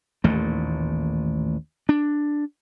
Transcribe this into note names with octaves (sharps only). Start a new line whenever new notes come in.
A1 D#2 A#2 A3
D4